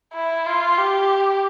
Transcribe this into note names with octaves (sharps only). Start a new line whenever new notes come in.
E4
F4
G4